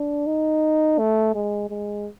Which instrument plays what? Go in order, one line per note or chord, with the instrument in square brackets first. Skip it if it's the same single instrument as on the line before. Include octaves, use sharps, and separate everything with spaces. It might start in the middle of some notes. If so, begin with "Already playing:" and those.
Already playing: [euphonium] D4
D#4
A3
G#3
G#3